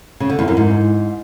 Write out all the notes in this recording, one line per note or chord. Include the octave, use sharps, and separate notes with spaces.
C#3
D3
E2
F#2
G#2